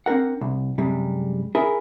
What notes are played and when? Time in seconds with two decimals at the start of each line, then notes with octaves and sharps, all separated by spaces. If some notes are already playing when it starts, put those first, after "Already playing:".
0.06 C4 D4 A#4 F#5
0.41 C2
0.78 F#2 C3 G3 G#3
1.55 E4 G#4 A#4